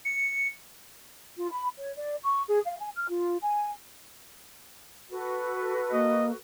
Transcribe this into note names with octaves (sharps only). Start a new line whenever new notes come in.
C#7
F4
B5
C#5
D5
C#6
G#4
F5
G#5
F6
F4
G#5
F#4 A4 B4
A#3 D#5